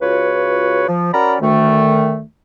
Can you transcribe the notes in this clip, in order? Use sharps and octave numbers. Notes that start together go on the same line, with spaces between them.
C#2 F4 F#4 B4 C#5
F3
C#4 F#4 A#4 D5 A#5 B5
D2 D#3 A3